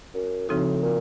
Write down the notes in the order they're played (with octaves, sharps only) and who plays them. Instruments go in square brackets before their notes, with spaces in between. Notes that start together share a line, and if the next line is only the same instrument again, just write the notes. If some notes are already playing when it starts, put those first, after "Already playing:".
[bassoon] F#2
[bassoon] A2 [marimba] C#3 F3 C4 D#4 F#4
[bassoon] A#2